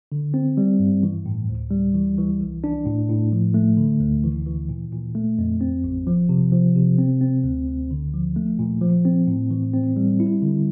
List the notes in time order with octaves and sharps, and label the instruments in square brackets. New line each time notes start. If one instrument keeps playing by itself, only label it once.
[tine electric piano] D3
C4
G3
G2
E3
A2
D2
G3
E3
E3
C2
D4
A2
A2
F3
A3
D3
D2
E3
E3
A#2
A#2
A3
F2
C4
A1
F3
C3
F3
C3
C4
C4
D2
D2
D3
F3
A3
A#2
F3
C4
A2
E3
C4
G3
E4
D3